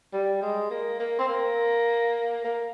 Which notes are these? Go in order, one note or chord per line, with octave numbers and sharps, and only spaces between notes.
G3
G#3
A#3
A#3
C4
A#3
A#3